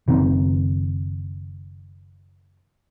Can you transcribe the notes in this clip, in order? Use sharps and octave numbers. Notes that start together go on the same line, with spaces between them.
F#1 D#3 C4